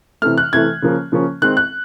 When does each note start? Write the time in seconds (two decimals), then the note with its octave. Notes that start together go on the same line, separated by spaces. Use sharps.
0.22 C3 E3 A3 F6
0.38 F#6
0.53 C3 E3 A3 G#6
0.82 C#3 F3 A#3 C#4
1.12 C#3 F3 A#3 C#4
1.42 D#3 G#3 C4 F#6
1.57 F#6